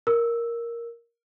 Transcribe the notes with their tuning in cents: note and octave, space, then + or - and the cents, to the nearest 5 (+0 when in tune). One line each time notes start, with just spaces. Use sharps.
A#4 +5 E6 +0